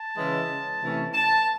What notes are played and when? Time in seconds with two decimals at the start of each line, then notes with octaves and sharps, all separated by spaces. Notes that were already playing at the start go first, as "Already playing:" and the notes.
Already playing: A5
0.17 C#3 E3 G#3 C#4 E4
0.82 C3 E3 A3 C#4
1.14 A5